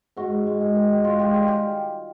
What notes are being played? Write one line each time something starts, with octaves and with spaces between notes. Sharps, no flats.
G#2 F#4
G#2
G#3
G#2
D#3
D#3
G#2 F4
G#2 G4
G3 G#4
G3 G4